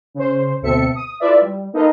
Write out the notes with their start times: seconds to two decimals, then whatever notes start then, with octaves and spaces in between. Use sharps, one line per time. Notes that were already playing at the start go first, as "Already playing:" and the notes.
0.14 C#3 C5
0.62 D2 B2 C4 A4 E5 C#7
0.95 D#6
1.20 E4 F4 A4 B4 D5 E5
1.41 G3
1.73 A#3 D#4 A4 B4 D#5 F5